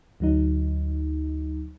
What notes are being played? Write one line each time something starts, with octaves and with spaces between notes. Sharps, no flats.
D2 F#3 D#4